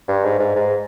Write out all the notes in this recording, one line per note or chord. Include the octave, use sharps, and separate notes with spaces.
G2
G#2
G#2
G#2